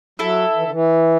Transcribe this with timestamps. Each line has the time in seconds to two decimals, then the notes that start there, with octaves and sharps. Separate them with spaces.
0.19 F#3 E4 A4 E5
0.56 E3
0.64 D3
0.71 E3